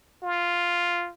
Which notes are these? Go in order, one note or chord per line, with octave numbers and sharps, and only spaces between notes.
F4